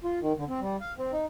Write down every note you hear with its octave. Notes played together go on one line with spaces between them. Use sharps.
F4
D#3
D3
C4
G3
F5
C4
D#4